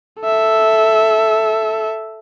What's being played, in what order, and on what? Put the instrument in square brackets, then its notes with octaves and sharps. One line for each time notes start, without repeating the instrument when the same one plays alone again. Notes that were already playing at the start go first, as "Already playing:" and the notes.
[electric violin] A4 E5